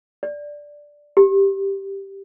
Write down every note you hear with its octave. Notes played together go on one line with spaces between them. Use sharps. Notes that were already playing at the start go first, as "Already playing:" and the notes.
D5
G4